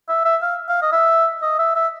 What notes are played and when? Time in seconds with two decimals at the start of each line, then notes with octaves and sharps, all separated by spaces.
0.09 E5
0.25 E5
0.42 F5
0.69 F5
0.82 D#5
0.92 E5
1.42 D#5
1.59 E5
1.76 E5